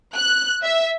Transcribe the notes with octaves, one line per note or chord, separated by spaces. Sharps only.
F#6
E5